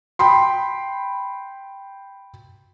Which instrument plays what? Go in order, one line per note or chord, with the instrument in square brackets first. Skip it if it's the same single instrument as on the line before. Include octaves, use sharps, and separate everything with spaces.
[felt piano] G5 B5 C6